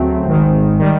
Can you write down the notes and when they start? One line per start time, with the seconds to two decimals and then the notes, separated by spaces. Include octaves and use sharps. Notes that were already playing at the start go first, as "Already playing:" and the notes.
Already playing: D2 C#3 F#3 A3 C4
0.26 G#1 G#2 D#3
0.79 D#3 G3